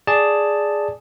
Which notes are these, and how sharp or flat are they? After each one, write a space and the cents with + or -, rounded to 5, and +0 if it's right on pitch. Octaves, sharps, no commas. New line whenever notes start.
G#4 +0 D5 +0 A5 +0